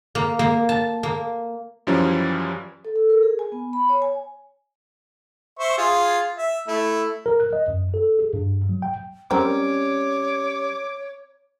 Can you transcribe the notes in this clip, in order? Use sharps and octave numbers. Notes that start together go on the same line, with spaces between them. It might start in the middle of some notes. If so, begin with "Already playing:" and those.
A#3
A#3
A5
A#3
F#2 E3 F3 G3 C#4
A4
A4
A#4
G#4
G#5
B3
B5
C#5
G#5
C5 E5 C#6
F4 G#4
E5
A3 E4
A#4
F#6
D#5
F#2
A4
G#4
G2
F#3
G5
G3 C4 C#4 A#4 C#5 D6